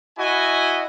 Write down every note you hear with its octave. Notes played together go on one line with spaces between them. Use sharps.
E4 F#4 D#5 G#5